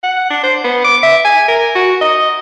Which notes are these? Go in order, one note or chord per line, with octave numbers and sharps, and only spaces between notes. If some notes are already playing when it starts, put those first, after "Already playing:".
F#5
D4
C5
B3
D6
E5
G#5
A#4
F#4
D#5